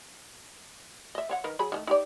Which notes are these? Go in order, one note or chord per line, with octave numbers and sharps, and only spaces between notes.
D#5 E5
C4 C#5 F#5
D#3 A#4 B4
F#3 G#4 B5
D#3 G#3 A3
D#4 G4 D5